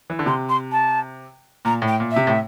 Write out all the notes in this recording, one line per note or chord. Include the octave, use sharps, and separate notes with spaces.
E3
D3
C3 C6
C6
A5
A#2 A#5
A2
G5
A#2
C3 E5
A2